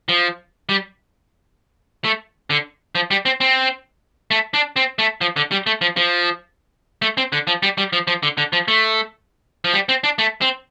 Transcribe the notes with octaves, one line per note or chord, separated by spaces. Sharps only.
F3
G3
A3
D3
F3
G3
C4
C4
A3
D4
C4
A3
F3
D3
G3
A3
F3
F3
A3
C4
D3
F3
G3
G3
F3
F3
D3
D3
F3
A3
F3
G3
C4
D4
A3
C4